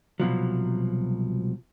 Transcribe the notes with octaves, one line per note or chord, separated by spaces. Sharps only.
C2 B2 F3 F#3